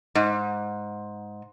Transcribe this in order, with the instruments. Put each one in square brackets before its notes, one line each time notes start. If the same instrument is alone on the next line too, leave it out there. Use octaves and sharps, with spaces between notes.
[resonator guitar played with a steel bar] G#2